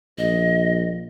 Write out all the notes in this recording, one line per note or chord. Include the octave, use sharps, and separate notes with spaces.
A#1 D#5